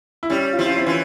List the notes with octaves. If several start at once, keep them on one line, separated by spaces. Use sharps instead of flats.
E4
G3 C#4
F4
F3 C4 E4
C#4 F4
C4 E4
E3 C#4 F4